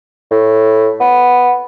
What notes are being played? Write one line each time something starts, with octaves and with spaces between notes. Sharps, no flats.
A2
B3